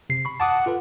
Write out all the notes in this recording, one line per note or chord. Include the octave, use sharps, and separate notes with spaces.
C3 C7
B5 C#6
F#5 A5 D6 D#6
F4 A4 B4